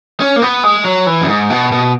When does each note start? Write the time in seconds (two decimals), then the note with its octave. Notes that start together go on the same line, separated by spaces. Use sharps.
0.20 C#4
0.36 A#3
0.42 B3
0.64 G#3
0.85 F#3
1.07 E3
1.21 F#2
1.28 G#2
1.50 B2
1.72 B2